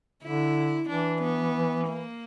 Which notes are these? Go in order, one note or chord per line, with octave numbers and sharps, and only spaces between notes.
D3 E4
E3 D4
B3
A#3